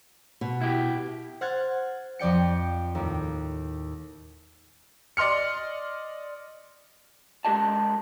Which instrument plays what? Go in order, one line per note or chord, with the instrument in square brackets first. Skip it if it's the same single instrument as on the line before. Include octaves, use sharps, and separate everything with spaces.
[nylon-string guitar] B2
[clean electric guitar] E4 G4
[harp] C5 F#5 F6 F#6 G#6 A6
F2 F3 D5 G5 C#7
D#2 A2
[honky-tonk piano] D5 D#5 C6 F6 C#7
[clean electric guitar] G#3 G4 A#4 D#5 A5